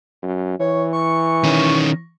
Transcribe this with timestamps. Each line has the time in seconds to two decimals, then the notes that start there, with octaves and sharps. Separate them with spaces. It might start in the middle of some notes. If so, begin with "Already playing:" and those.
0.22 F#2
0.59 E3 C#5
0.93 C#6
1.44 D#3 C#4